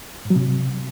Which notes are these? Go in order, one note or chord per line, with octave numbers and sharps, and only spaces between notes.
G#2
F#3
C3